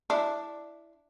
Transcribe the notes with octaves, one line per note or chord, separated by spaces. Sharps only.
D4 E4